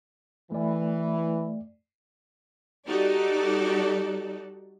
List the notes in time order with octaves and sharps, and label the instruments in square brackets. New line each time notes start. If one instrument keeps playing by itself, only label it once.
[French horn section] E3 [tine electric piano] A3 D5
[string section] G3 D#4 F#4 G4 A4 D5